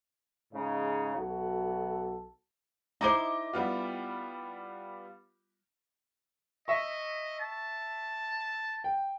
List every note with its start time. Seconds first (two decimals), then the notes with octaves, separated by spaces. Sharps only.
0.53 G#2 C#3 D#4
1.16 B1 F#4 A4
3.01 D#4 E4 C5 D#5 D6 G7
3.53 G3 B3 F4
6.68 D#5 E5 C#6
7.40 A5
8.84 G5